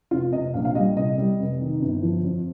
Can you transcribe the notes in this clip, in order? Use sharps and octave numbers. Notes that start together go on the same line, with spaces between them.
F1 F4
C3 D#5
A#1 F5
F5
G3 D#5
C2 D#5
G3
F1
D#3
G1
F3
F2